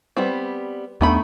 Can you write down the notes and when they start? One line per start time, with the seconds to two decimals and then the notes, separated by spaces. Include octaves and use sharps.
0.17 G3 B3 C4
1.01 D#2 D#3 A3 B3 D4 B5